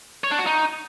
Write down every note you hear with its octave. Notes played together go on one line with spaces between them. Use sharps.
C#5
D4
F#4
D#4